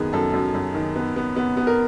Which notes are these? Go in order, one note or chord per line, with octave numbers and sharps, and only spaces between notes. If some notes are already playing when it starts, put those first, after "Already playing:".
Already playing: F#2 D#3 B3 G#4
F#2 A4
F#2
F#2
D#3
B3
B3
B3
B3
A#4